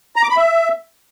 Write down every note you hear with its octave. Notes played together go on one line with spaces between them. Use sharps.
A#5
D6
B5
E5